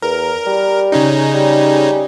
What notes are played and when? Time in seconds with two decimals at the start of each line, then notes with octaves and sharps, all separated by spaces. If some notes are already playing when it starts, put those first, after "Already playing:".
0.02 E2 A#4
0.47 G3
0.92 C#3 C#4 D#4
1.34 G3